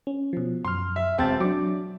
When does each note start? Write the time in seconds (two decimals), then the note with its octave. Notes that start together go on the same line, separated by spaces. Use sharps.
0.07 C#4
0.33 B2 F3
0.65 F#2 C6 F6
0.96 E5
1.18 E1 C4 E5 G5 A5 A6
1.40 F#3 D4 D6